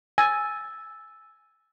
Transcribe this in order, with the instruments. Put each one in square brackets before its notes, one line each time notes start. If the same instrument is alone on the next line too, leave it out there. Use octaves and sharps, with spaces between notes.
[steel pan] G#5 [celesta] E6 A6